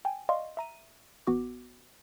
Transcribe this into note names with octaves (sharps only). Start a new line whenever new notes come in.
G5 G#5
D5 D#5 F5 C6 C#6
E5 A#5 D#7
A1 B3 F#4 D6